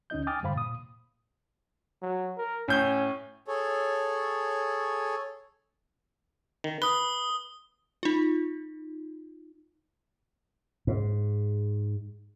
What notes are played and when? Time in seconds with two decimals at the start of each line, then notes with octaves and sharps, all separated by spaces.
0.10 D2 C#4 D#4 D#5 G6
0.27 G5 G#5 D6 D#6 F6 A6
0.43 E2 G2 D3 C5 F5 B5
0.54 A#2 D#6
2.02 F#3
2.37 A#4
2.68 A2 C#4 G6 G7
3.48 G#4 A4 C#5
6.64 D#3
6.82 B4 D#6 G7
8.03 D#4 F4
10.87 G#2